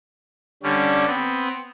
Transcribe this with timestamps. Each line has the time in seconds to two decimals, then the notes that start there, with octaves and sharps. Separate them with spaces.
0.63 D3 G3 C#4
1.07 B3 C4